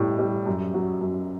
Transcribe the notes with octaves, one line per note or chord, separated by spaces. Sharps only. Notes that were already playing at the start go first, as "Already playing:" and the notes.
Already playing: A2 G3
G3
F#2
F#3
F#2